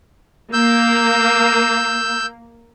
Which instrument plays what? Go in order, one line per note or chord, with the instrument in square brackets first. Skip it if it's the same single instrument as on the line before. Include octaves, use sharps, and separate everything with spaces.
[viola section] A#3 [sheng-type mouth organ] E6 G6